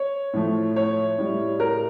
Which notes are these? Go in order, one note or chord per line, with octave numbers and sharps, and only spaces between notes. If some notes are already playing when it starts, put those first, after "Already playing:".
Already playing: C#5
A2 F3 A3
C#5
A2 G3
A#4